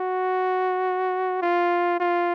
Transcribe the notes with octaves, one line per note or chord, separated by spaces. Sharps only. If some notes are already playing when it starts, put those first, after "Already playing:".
Already playing: F#4
F4
F4